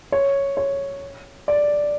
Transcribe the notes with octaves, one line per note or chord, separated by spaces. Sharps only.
C#5
C#5
D5